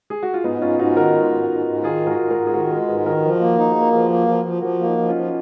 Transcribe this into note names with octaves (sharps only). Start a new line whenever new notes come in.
G#4
F#4
F4
G#2 B3 D#4
G#2 C#4 F4
G#2 D#4 F#4
D#3 F#4 A#4
G#3 D#4 F#4
G#2
G#2
G#2
D#3 F4 G#4
G#2
F#4 A#4
G#2
F#4 A#4
G#2
G#4
D#3 F#4 A#4
G#3 F#4 A#4
G#2 G#4 B4
D#3 F#4 A#4
F3
A#3
F4
D#4 F#4
A#3 G#4
A#4
F3 G#4 B4
A#3
F3
F3
F3 F#4 A#4
A#3
D#4 F#4
F3
C#4 F4
F3